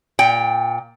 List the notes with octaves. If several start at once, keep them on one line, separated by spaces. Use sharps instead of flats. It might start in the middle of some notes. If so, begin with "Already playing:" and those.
A#2 G5